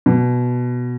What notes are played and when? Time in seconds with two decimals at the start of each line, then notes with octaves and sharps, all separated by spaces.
0.06 B2